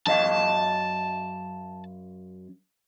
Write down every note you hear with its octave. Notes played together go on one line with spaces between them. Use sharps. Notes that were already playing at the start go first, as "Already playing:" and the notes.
F#2 D#5 F5 A5